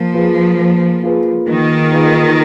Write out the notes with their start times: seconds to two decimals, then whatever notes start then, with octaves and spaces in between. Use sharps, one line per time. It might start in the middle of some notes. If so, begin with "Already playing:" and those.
Already playing: F3 A#3
0.14 F4 G#4 B4
0.59 A#3
1.03 F4 G#4 B4
1.47 D#3 A#3
1.92 F4 G#4 B4